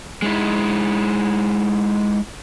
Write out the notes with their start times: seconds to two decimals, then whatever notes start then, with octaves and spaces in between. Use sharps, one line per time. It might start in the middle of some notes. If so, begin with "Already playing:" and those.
0.22 G#3 D#4 E4